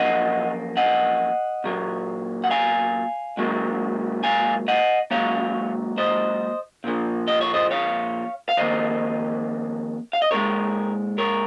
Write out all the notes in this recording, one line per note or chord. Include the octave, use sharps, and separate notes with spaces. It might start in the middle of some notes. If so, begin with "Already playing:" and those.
Already playing: F#2 F3 A#3 D#5 F#5
D#5 F#5
A#2 F#3 A#3
F#5
F5 G#5
G#2 F#3 A#3
F5 G#5
D#5 F#5
G#2 F#3 A#3 C#5 F5
C5 D#5
A#2 F3 A#3
D#5
C#5
C5 D#5
C#5 F5
F5
F2 D#3 A#3 C5 D#5
F5
D#5
A#2 G#3 A#4 C#5
A#4 C#5